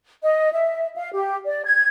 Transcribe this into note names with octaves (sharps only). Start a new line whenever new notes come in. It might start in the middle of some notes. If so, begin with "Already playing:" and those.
D#5
E5
F5
G4
D5
G#6